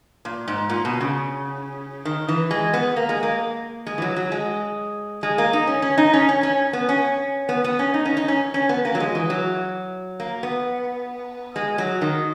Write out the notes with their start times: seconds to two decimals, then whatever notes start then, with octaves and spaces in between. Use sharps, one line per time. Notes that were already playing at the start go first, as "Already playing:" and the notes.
0.25 A#2
0.48 G#2
0.69 A#2
0.85 B2
1.01 C#3
2.05 D#3
2.28 E3
2.51 G#3
2.73 B3
2.96 A#3
3.09 G#3
3.23 A#3
3.86 G#3
3.98 E3
4.02 F#3
4.16 F#3
4.32 G#3
5.23 G#3
5.38 A#3
5.53 D#4
5.67 C#4
5.82 C#4
5.98 D#4
6.14 C#4
6.29 C#4
6.43 C#4
6.73 B3
6.89 C#4
7.49 B3
7.64 B3
7.79 C#4
7.94 D#4
8.05 C#4
8.17 D#4
8.28 C#4
8.54 C#4
8.69 B3
8.85 A#3
8.95 F#3
9.00 G#3
9.15 E3
9.30 F#3
10.20 A#3
10.43 B3
11.56 G#3
11.78 F#3
12.01 D#3